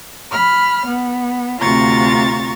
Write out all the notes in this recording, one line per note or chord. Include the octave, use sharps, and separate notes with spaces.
B5 F6
B3
D2 C3 F4 A#5 C#6 A6